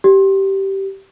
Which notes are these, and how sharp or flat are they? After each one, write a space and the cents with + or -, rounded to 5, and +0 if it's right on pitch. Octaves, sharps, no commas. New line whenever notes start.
G4 -15